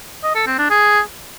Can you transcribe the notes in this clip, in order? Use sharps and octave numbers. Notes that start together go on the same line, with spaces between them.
D#5
A4
C4
D4
G#4